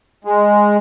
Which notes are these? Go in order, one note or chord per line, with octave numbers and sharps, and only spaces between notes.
G#3